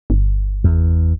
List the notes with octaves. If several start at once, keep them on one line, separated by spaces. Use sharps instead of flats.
G1
E2